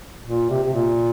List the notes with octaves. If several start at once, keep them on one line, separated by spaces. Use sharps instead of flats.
A#2
C3
C3
A#2